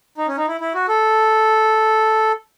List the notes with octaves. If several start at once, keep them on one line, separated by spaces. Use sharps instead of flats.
D#4
C#4
D#4
E4
E4
F#4
A4